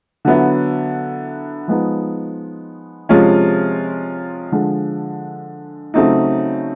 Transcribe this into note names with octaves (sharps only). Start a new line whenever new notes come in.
D3 F#3 B3 E4
F3 G#3 B3 D#4
C3 F3 G#3 C#4 F4
D3 F3 G#3
C#3 F#3 A3 C4 D#4